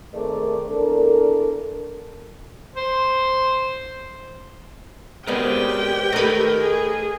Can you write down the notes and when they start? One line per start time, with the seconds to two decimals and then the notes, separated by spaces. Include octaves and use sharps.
0.12 D#3 A3 C4 G#4 A#4 D5
0.67 E2 D4 A4 A#4
2.75 C5
5.27 G#3 B3 C4 G4 A#4 B4 D5 G5
6.13 A3 A#4 B4 D#5
6.58 G#4